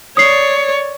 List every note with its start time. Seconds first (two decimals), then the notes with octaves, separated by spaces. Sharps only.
0.17 C#5 D5 D#6 C7